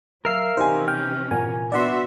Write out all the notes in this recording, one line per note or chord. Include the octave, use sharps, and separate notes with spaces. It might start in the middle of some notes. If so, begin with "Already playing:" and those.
F#3 A#4 E5 F5 F6 C7
C3 E3 C#4 D#4 G4 C5 G#5
G5 F6
A#2 A#4 F#5 G#5
B3 D4 F#4 D5 E5 F#5 C6